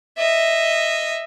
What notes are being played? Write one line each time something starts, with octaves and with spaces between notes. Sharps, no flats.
D#5 E5